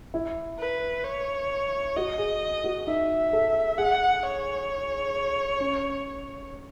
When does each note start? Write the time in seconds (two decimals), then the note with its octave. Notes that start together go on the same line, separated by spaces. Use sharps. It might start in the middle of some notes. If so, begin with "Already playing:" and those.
0.14 E4
0.59 B4
1.05 C#5
1.96 F#4 D#5
2.18 G#4
2.64 F#4
2.87 D#4 E5
3.33 A4
3.78 G#4 F#5
4.24 C#5
5.60 C#4